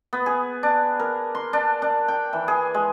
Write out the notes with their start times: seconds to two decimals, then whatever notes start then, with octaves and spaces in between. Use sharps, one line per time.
0.13 B3
0.26 G#4
0.63 D4
1.00 A#4
1.35 C6
1.53 D4
1.82 D4
2.08 G5
2.33 E3
2.48 G#4
2.74 G#3